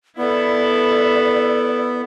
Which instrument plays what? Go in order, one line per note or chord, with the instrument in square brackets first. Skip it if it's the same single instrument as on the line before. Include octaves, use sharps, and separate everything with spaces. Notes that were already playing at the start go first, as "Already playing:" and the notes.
[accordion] B3 [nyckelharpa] E4 A4 [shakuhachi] D5